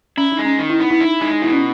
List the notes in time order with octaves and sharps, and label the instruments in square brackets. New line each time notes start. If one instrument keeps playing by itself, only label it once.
[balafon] C#4 [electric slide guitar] E4
[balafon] D#4
[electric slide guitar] G#3
[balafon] C#4
[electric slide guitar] D#3 [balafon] D#4
[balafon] E4
[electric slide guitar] B3 [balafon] D#4
[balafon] E4
[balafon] D#4 [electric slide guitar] E4
[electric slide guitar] G#3 [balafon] D#4
[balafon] D#4
[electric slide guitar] B2 [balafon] E4
[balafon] C#4